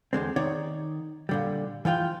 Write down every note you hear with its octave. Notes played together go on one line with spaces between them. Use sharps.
E2 D3 G#3 C4
D#3 D#4 C#5 D5
A#2 D3 G3
E3 F3 F4 G5